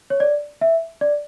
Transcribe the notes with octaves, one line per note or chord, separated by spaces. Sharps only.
C#5
D5
E5
D5